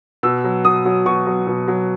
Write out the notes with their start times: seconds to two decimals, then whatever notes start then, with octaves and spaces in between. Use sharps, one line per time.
0.23 B2 E6
0.44 F#3
0.65 B2 D#6
0.85 F#3
1.05 B2 C#6
1.26 F#3
1.47 B2
1.68 F#3